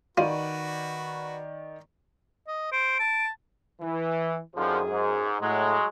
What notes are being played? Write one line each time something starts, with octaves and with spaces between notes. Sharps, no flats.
D#3 F4 F#4 B4 D5 D#7
D#5
C5 D7
A5
E3
F#2 D3 D#3 F3 G#4
G#2
A2 F#3 G#3